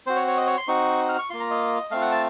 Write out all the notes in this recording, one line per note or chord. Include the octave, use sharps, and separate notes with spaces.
C4 F#4 C5
C#5
C#5
D#5
C#5
C6
C4 D#4 F#4 C#6
F6
C#6
A#3 F4 C6
A#5
D#5
A3 C4 F4 F5
F#5
A5